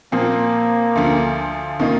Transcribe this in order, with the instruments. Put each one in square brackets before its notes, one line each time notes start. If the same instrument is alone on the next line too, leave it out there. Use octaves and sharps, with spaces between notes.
[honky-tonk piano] A#2 F3 C4 [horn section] A#3
[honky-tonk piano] D2 D3 F3
C3 D#3 A#3 D#4